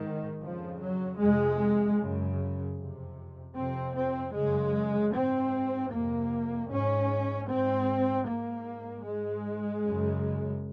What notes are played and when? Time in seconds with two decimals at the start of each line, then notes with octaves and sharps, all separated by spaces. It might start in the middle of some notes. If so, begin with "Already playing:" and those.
Already playing: G#2 D#3
0.41 F2 C#3 F3
0.81 F#3
1.20 F2 C3 G#3
1.99 F#2 C#3
2.77 F2 C3
3.55 F2 C3 C4
3.95 C4
4.34 F#2 C#3 G#3
5.13 G#2 C4
5.91 F2 C3 A#3
6.69 G#2 C#4
7.48 G#2 C4
8.27 G#2 A#3
9.05 G#2 G#3
9.84 F#2 C#3